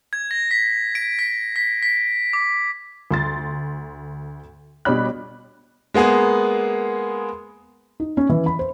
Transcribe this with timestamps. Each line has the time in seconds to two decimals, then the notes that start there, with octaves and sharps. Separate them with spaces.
0.13 G#6
0.31 A#6
0.51 B6
0.95 D7
1.19 B6
1.56 B6
1.82 B6
2.33 D6
3.11 D2 C6 A6
4.85 B2 G3 D4 C#5 B5 F#6
5.94 G#3 A#3 B3 G#4
8.00 D#4
8.17 C#4
8.29 E3
8.46 B5
8.59 C5